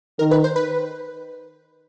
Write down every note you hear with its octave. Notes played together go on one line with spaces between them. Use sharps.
D#3 A#4
B4
C5
B4